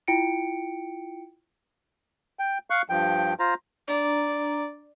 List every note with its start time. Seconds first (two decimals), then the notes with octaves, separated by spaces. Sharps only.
0.08 E4 F4 G5 C#7 D7
2.39 G5
2.70 F5 C#6 F#6
2.89 G2 F3 G5
3.39 F4 C5 A#5
3.88 D4 D5 A#5